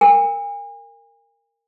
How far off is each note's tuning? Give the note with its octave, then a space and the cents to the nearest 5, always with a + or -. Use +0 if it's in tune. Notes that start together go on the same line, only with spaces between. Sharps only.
A#4 -20 G#5 -40